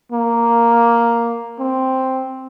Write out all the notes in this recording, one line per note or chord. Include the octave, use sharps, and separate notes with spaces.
A#3
C4